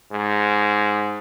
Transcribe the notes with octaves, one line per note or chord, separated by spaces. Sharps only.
G#2